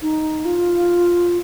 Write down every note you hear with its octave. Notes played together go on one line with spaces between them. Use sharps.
D#4
F4